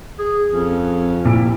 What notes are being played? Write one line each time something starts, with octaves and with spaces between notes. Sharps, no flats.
G#4
F2 C#4
A#2 E4 G4